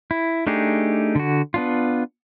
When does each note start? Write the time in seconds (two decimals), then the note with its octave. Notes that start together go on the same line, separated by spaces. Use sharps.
0.11 E4
0.47 A3 D4 D#4 G4 G#4
1.15 D3 F#4
1.54 B3 D4 F4